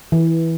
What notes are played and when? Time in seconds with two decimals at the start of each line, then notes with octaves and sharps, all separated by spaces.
0.12 E3